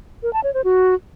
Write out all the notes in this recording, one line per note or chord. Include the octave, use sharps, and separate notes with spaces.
A#4
A5
C#5
C5
F#4